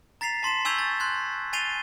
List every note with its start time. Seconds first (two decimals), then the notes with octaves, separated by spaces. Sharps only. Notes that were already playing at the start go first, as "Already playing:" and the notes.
0.21 A#5 A6 B6 C7 F7
0.43 A5 C6 B6 E7
0.65 G#5 C#6 E6 G6 G#6 F7
0.78 A6
1.00 C6 F#6 G#6
1.53 G#5 A6 C7 D#7 F7 G7